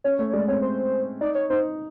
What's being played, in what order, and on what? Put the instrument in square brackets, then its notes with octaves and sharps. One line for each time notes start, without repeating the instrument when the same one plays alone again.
[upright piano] C#4 [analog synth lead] C#5
[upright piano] A3 [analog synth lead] C#5
[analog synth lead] C#5
[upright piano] G#3 [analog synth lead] D5
[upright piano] C4 [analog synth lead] C#5
[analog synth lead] C5
[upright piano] D#4 [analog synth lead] D5
[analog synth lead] C#5
[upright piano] D#4 [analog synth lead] C5